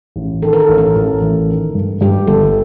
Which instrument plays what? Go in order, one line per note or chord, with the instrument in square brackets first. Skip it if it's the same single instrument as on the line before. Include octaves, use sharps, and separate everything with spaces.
[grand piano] A1
[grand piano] D#3 [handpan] A4
[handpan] A#4
A4
[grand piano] A1
[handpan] A#4
[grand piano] A1
A1
D#3
G2
[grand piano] G2 [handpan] G4
[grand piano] G1 [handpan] A4